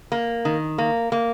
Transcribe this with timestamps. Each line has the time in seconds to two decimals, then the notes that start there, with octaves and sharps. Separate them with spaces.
0.12 A#3
0.45 D#3
0.78 A#3
1.12 A#3